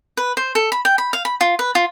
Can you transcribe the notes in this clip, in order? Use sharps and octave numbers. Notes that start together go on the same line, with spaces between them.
B4
C5
A4
B5
G5
B5
F5
B5
F4
B4
F4